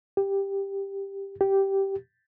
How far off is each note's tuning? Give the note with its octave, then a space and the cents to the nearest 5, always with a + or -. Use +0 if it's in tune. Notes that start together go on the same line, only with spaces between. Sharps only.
G4 +5
G4 -10